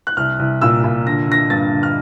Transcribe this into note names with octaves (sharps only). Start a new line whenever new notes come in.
F#6
C2 F6
C2
A#2 E6
A#2
D3 A#6
D3 A#6
G2 A6
D3
F6